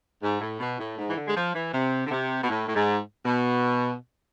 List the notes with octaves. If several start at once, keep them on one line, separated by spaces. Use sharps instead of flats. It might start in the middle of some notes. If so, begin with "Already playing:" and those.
G#2
A2
B2
A2
G#2
E3
D3
G#3
F3
E3
C3
D3
C3
B2
A2
A2
G#2
B2